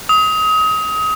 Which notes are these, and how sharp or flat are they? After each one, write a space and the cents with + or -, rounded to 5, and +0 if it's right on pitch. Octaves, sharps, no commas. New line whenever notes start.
D#6 +30